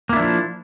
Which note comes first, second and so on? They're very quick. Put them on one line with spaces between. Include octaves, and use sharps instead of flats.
A#3 E4 D4 F3